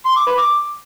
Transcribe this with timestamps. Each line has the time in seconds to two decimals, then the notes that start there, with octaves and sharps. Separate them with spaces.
0.05 C6
0.16 D6
0.27 B4
0.37 D6